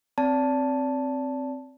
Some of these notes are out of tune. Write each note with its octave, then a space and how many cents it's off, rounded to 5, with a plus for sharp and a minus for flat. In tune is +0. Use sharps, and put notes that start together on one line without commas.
C4 +0 D5 -35 A5 +0